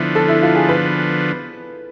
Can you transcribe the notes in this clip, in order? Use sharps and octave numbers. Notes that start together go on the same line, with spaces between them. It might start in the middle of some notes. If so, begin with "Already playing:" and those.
Already playing: D3 F3 B3 E4
A4
E4
F4
G#4
B4